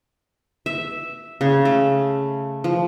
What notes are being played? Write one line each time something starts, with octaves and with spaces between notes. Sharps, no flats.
E5
C#3
A3
F3